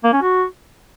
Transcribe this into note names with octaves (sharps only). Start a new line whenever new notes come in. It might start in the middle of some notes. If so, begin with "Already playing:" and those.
A#3
C#4
F#4